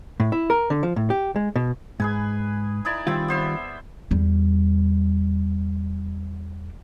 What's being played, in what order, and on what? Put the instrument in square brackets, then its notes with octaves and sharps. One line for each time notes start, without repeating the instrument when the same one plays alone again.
[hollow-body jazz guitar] A2
E4
A#4
D3
F3
A2
G4
G#3
B2
[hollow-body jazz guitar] G#2 [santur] G#4 B4 G#5
[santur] D#4 E4 D5
[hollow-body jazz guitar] D#3 G3 F4 [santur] C4 E5
[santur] B3 C5 E5
[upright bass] E2 G3